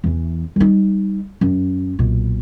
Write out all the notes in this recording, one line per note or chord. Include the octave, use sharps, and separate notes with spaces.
E2 E3
G3 D#4
F#2
B1 A#2